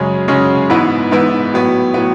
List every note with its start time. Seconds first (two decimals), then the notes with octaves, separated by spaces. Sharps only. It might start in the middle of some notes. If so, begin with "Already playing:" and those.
Already playing: F#2 C#3 G#3 C#4
0.28 F#2 C#3 G#3 C#4
0.70 G#2 E3 B3 E4 B4
1.11 G#2 E3 B3 E4 B4
1.53 A2 F#3 B3
1.94 A2 F#3 B3